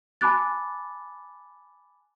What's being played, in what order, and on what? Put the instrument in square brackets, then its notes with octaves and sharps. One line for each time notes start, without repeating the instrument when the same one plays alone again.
[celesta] G#5 A5 B5 D6 F#6 A6